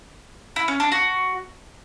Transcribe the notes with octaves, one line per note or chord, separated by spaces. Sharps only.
E4
C#4
D4
F#4